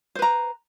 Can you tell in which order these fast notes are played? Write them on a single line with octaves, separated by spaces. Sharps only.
C5 B4 A#5